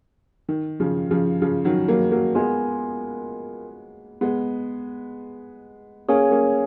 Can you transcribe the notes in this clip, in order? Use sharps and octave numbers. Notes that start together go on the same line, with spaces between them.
D#3
C#3 F3
C#3 F3
C#3 F3
D#3 F#3
F#3 A#3
F#3 A#3
G#3 B3 F4 A#4 D#5 G#5
G#3 B3
A#3 C#4 G#4 C#5 F5 G#5
A#3 C#4